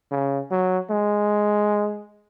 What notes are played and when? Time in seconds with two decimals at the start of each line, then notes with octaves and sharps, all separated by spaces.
0.12 C#3
0.51 F#3
0.90 G#3